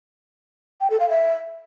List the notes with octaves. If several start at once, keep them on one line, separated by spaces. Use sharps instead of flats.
G5
A4
F5
E5